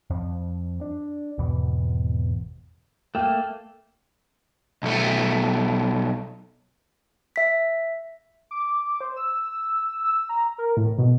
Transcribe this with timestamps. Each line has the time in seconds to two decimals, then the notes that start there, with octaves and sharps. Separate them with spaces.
0.10 F2 F3
0.81 D4
1.38 G#1 E2 B2 E3
3.15 A3 A#3 G5
4.83 B1 A3
7.36 E5 B6
8.51 D6
9.01 C5
9.16 E6
10.04 E6
10.29 A#5
10.58 A#4
10.77 A2
10.98 B2